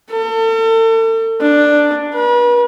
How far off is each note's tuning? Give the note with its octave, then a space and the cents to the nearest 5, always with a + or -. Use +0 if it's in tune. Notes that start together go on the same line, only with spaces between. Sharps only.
A4 +40
D4 +5
B4 -40